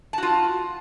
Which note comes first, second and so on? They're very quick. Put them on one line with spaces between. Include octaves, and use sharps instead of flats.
A5 F#4 F4